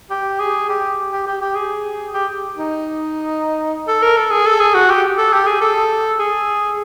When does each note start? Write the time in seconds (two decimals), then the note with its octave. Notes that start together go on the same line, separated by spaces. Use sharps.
0.10 G4
0.40 G#4
0.69 G4
1.12 G4
1.26 G4
1.41 G4
1.55 G#4
2.13 G4
2.57 D#4
3.88 A4
4.02 A#4
4.16 A4
4.31 G#4
4.46 A4
4.60 G#4
4.74 F#4
4.90 G4
5.18 A4
5.33 G4
5.47 G#4
5.61 A4
6.19 G#4